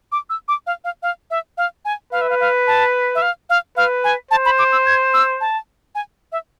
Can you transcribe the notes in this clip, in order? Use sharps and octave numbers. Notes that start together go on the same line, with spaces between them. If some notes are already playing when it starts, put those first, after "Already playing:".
D6
E6
D6
F5
F5
F5
E5
F5
G#5
B4 F5
E5
F5
F5
A5
E5
F5
F5
B4 F5
G#5
C5 A5
B5
D6
E6
G#6
E6
A5
G#5
E5